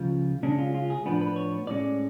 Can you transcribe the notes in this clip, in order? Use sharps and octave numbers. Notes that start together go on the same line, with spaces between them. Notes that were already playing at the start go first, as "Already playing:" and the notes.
Already playing: C#2 C#3 F3 F4
C#3 G#3 C#4 D4
F4
F4
G#4
A2 F3 B3 D4 B4
B4
C#5
A2 G#3 C#4 D5